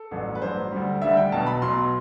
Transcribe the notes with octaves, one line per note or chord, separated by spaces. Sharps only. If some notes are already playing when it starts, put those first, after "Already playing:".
Already playing: A4
A1 G2 F#3
B4
A1 G2 F#3 C5
D2 D3 G3
D2 D3 G3 E5
G5
B1 B2 F#3 A5
B5
B1 B2 F#3 C6